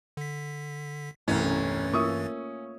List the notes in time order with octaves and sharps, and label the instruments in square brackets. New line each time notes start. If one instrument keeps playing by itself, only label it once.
[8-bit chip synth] D3 B6
[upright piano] E1 C2 [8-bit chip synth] G2 E3 A6 [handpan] A3 [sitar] C#4
[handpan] A#3 F4 E5 [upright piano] C#6 D#6